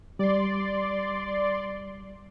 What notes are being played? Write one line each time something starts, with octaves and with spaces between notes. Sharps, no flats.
G3 D5 C6